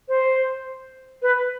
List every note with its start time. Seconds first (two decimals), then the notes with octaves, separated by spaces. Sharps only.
0.08 C5
1.22 B4